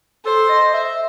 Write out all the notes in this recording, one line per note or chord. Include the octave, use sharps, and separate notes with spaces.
A4 C5
D#5
E5